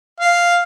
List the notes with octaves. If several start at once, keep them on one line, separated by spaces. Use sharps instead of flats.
F5